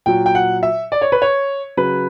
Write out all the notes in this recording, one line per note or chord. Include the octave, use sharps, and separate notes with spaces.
A#2 F#3 G5
G5
F#5
E5
D5
C#5
B4
C#5
C#3 F#3 B4